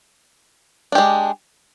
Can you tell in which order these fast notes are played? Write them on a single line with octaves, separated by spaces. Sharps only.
D4 G4 G#3